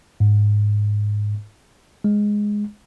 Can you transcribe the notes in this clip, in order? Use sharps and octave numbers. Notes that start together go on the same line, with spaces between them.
G#2
G#3